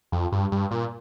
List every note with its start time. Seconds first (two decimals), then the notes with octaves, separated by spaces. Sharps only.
0.12 F2
0.32 G2
0.52 G2
0.71 A#2